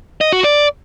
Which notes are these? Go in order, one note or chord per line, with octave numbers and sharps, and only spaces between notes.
D#5
F#4
D5